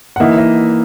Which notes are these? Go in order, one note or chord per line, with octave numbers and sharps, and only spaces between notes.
F#5
E3 A#3 D#4 E5
D#5